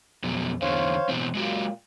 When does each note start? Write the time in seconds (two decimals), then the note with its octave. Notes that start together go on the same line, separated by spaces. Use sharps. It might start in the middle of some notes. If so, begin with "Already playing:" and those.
0.23 F2 B2 F#3
0.62 E2 D3 E3 C5 C#5 F5
1.09 B2 E3 C4
1.35 A#2 G#3 F#4 G4